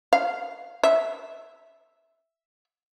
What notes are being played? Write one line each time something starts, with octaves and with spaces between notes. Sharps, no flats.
F5
E5